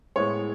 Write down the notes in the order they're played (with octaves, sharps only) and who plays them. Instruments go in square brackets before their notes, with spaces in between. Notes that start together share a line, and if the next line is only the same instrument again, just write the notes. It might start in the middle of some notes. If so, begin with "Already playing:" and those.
[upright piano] A2 G#3 B3 C#5